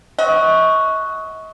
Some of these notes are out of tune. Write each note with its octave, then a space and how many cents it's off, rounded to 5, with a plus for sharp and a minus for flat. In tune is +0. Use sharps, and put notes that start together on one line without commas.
F#4 +0 D#5 +40